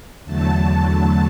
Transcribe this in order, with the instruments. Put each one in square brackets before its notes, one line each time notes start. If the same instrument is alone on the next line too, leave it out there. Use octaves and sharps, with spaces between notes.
[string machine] E2 D3 F#3 A3 A5